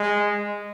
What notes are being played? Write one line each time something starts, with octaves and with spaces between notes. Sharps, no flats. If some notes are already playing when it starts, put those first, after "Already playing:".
Already playing: G#3